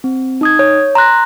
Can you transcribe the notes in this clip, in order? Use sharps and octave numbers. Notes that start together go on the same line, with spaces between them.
C4
D#4 D#6 G#6
C#5
A#5 C6 F#6 A#6